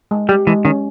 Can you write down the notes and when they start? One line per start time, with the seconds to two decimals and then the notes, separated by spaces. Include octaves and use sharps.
0.11 G#3
0.29 G3 G4
0.47 E3 G#3
0.65 D#3 C#4